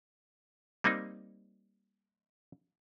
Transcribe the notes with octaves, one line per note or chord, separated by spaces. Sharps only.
G3 A#3 C4 D#4